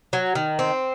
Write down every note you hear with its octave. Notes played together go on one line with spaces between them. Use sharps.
F#3
D#3
C4